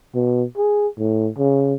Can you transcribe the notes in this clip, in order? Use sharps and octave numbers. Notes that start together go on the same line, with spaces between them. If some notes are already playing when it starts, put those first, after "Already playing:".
B2
G#4
A2
C#3